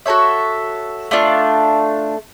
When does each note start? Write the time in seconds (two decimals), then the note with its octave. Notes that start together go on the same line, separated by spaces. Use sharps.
0.06 F#4 A4 C#5 E5
1.11 A3 D4 F4